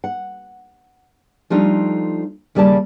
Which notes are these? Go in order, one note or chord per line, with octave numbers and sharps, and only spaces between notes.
F#5
F3 G3 A3 D4 D#4 F4
D#2 C#3 G3 A#3 D5 A5